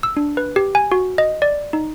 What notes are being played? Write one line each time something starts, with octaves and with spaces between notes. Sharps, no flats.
E6
D4
B4
G4
G#5
F#4
D#5
D5
D#4